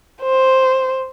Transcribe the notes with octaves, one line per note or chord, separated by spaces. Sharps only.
C5